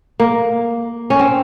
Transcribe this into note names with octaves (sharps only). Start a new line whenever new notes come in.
A#3
C#4
C4